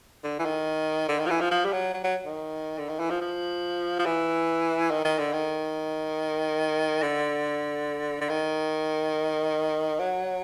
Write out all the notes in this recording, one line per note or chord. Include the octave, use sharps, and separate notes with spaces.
D3
E3
D#3
D3
D#3
F3
E3
F3
F3
G3
F#3
F#3
F#3
D#3
D3
D#3
E3
F3
F3
F3
E3
D#3
D#3
D3
D#3
D3
D3
D#3
F#3